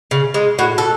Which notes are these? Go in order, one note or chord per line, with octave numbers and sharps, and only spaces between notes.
C#3
G#3
A2 F#4
A4